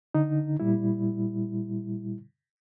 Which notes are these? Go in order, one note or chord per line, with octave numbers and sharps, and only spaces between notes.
D3 D#4
A#2 G3 E4